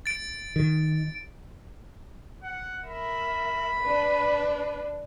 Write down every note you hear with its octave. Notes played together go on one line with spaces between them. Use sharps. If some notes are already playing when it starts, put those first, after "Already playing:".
A6 D7
D#3
F#5
A#4 E5 B5
D4 B4